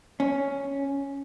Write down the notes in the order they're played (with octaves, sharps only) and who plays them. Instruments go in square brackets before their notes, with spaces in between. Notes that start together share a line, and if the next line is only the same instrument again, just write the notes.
[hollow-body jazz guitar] C#4